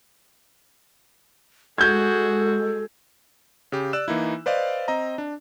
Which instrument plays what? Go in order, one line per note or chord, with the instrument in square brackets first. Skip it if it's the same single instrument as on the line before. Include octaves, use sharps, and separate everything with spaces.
[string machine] G#3 [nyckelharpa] F#4 G#4 [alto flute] A4 [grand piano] G6 G#6
[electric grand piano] C#3 G4
D5 E6 F#6 E7
E3 A#3 D#4 E4
B4 C5 D5 D#5 F5
C4 D#5 A#5
D4